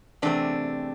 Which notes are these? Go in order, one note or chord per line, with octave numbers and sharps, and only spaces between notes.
E2 C3 A3 C4 D4